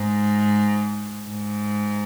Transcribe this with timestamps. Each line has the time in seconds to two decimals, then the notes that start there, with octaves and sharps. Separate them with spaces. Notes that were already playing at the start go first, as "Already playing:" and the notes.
Already playing: G#2
1.29 G#2